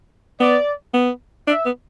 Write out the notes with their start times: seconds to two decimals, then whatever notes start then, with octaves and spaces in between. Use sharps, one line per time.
0.40 B3 D5
0.94 B3
1.47 D4 E5
1.65 B3